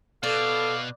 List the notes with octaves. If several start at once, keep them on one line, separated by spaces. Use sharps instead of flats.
B2 A4 D5 F5